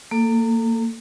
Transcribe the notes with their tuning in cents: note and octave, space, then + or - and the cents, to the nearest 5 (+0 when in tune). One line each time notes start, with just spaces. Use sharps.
A#3 -30 A4 +5